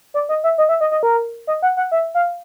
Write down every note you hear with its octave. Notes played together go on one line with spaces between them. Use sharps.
D5
D#5
E5
D#5
E5
D#5
D#5
A#4
D#5
F#5
F#5
E5
F5